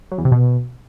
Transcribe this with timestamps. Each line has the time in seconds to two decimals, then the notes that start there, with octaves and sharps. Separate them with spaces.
0.12 F#3
0.18 E2
0.25 C3
0.32 B2